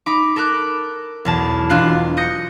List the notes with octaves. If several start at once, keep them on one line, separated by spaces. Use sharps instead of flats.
D#4 B5 D6
A4 A#4 D6 F#6
B1 E2 A5
E1 D4 F4 F#6 C7
D#6 G6 A#6 C#7